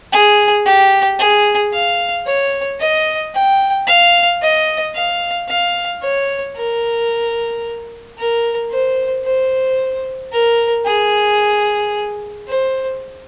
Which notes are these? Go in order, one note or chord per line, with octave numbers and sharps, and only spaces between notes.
G#4
G4
G#4
F5
C#5
D#5
G5
F5
D#5
F5
F5
C#5
A#4
A#4
C5
C5
A#4
G#4
C5